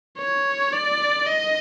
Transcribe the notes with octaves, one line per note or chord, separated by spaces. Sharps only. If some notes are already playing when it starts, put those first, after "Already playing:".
C#5
D5
D#5